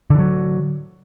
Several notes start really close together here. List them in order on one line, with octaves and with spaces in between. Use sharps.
D3 E3 F#3